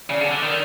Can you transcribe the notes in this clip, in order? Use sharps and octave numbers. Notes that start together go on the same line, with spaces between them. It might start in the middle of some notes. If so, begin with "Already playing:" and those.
C#3 D5
D3
D3
D#3